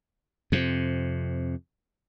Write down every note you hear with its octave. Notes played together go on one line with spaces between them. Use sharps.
F2 C3